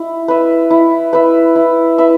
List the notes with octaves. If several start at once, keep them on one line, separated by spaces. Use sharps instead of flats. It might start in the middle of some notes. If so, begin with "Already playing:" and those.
Already playing: E4
B4 E5
E4
B4 E5
E4
B4 E5